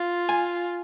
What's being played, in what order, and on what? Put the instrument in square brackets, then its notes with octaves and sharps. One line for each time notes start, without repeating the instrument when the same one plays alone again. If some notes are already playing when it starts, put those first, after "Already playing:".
Already playing: [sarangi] F4 [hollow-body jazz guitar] F5
[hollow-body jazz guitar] G#5